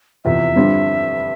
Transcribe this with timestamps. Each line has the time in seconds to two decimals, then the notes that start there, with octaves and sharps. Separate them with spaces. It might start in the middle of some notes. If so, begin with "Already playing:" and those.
0.25 F1 E2 C3 F3 E5
0.56 G2 D3 G3 C4 F4